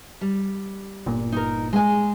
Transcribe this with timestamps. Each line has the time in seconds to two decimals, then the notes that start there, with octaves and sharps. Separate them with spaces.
0.21 G3
1.06 G1 A#2
1.32 D#4 A#4
1.73 G#3 G#5